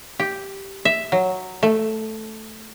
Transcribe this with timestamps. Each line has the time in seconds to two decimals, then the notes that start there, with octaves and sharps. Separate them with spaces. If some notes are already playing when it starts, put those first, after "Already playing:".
0.20 G4
0.85 E5
1.12 F#3
1.63 A3